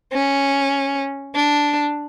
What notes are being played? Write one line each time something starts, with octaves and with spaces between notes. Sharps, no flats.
C#4
D4